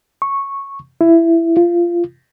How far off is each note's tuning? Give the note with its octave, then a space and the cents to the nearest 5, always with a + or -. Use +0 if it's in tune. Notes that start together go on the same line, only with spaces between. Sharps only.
C#6 -10
E4 +15
F4 -20